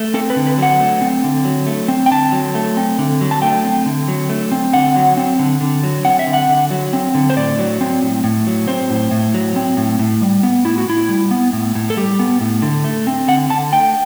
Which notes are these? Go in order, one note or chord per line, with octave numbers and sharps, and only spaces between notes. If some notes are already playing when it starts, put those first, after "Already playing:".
Already playing: A3
C4 A4
B4
D3
B4
F#3 F#5
A3
C4
D3
F#3
A3
C4
G5
D3 A5
F#3
A3
C4
D3
F#3
A5
A3 G5
C4
D3
F#3
A3
C4
D3 F#5
F#3
C4
D3
D3
F#3
C4 F#5
E5
D3
F#5
D3
F#3
C4
D3
C5
A2 D5
F#3
C4
A2
A2
F#3
C4 C5
A2
A2
F#3
C4
A2
A2
G3
B3
A2 E4
F#4
A2 E4
G3
B3
A2
A2
A4
G3 G4
B3
A2
D3
A3
C4
D3 F#5
D3 A5
A3 G5